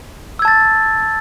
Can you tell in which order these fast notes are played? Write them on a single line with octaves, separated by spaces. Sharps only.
E6 G#6 A5 A6